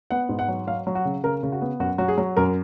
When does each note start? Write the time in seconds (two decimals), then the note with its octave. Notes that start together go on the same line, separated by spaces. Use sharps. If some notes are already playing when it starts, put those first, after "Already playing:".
0.11 B3 F#5
0.29 G#2
0.39 F#5
0.48 F#3
0.67 F#3 F5
0.87 F#3
0.95 F#4
1.05 C#3
1.23 C#3 A#4
1.43 C#3
1.52 F#4
1.62 B3
1.80 F#2 F#4
1.98 F#3 F#4
2.08 G#4
2.18 F#3
2.37 F#2 A#4